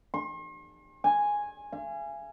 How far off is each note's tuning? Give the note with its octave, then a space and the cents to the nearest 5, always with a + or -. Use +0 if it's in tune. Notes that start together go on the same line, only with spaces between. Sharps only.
C6 +45
G#5 -5
F5 -45